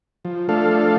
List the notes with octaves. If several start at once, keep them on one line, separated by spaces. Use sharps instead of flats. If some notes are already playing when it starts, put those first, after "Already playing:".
F3
F3 A3 D4 A4 F5